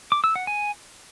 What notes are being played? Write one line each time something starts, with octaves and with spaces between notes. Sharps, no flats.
D6
E6
F#5
G#5